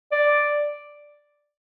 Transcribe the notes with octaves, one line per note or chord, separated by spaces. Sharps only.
D5